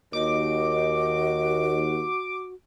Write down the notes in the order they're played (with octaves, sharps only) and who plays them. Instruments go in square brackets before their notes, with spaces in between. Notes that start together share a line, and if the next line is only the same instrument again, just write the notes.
[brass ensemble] D#2 [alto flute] F#4 [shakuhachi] D#5 [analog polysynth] D6